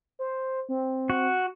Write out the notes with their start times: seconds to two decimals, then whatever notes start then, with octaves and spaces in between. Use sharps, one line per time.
0.19 C5
0.69 C4
1.10 F#4